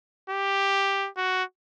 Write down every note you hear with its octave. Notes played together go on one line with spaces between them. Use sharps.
G4
F#4